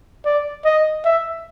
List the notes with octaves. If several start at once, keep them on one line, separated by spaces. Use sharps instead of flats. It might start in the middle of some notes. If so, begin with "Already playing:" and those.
D5
D#5
E5